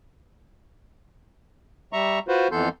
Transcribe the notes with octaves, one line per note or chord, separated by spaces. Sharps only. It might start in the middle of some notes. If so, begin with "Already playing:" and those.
G3 E5 A#5 C#6
F4 F#4 B4 C5
F2 E3 B3 A4 C6 G6